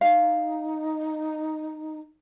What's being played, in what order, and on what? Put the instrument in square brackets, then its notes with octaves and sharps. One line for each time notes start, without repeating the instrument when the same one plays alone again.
[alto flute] D#4 [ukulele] F5